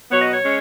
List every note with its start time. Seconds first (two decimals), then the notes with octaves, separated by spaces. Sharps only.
0.10 B2 F#3 B3 C#5
0.22 D#5
0.34 C#5
0.45 G#3 C#4